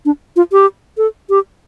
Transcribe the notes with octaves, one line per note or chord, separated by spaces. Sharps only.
D4
F4
G4
A4
G4